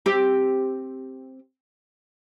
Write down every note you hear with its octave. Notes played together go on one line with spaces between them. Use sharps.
C4 G4